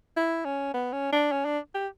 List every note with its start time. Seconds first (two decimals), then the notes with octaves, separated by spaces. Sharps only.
0.17 E4
0.45 C#4
0.74 B3
0.93 C#4
1.13 D4
1.32 C#4
1.45 D4
1.74 G4